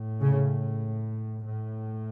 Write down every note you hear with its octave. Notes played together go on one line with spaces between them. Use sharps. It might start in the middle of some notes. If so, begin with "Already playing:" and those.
Already playing: A2
C#3
A2